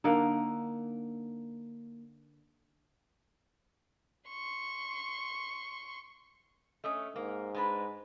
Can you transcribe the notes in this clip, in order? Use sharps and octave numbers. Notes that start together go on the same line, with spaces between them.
D3 A#3 D#4 F#5
C6 C#6
A3 C#4 D#5 D#6
G#2 A#3
G#3 D4 B4